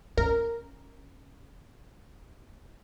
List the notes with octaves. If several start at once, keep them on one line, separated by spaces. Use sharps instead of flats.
C#4 A#4